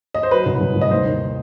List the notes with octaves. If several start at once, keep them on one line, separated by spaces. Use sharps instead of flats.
D#5
C5
F#3 B4
C2
C2
C2
D#5
D#2 C5
D#3